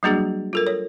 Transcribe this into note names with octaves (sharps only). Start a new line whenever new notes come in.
F#3 G3 A#3 D4 F#4 G#4
F4 A4 A#4
C#5